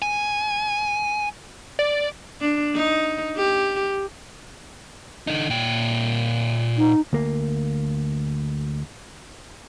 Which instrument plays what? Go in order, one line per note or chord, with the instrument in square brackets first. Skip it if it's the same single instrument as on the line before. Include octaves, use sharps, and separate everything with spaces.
[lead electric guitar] G#5
[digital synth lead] D5
[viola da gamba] D4
D#4
G4
[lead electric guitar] D3 D#4
A#2 G5
[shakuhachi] D#4
[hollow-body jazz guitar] D2 A#3